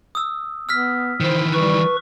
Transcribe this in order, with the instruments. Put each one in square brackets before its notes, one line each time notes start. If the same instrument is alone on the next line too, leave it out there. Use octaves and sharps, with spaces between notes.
[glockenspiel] D#6 E6
[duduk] B3 [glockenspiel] E6 F6 B6
[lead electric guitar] D#3 E3 [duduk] C5
[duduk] G3 [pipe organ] B4 C#6